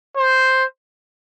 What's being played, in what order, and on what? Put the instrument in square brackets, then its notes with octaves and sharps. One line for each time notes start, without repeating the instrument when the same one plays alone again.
[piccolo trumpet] C5